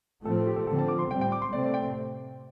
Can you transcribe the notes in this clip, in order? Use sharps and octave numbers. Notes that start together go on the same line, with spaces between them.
A2 F3 A3 C4 A4
A4
G4
A4
D3 F3 C4 A4
A5
D6
C6
A2 G3 C4 G5
G5
D6
C6
C3 A3 C4 D5
D5
G5